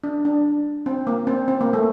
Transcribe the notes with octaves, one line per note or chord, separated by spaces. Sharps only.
D4
D4
C4
A#3
C4
C4
A#3
A3